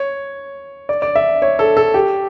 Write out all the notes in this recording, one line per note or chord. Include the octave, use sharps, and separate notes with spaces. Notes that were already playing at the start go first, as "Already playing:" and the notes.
Already playing: C#5
D5
D5
E5
C#5
A4
A4
G4